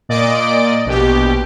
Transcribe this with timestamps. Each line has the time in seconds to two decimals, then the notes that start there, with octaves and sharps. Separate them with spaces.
0.09 A#2 D5 D#5 D7
0.85 A#1 B2 G4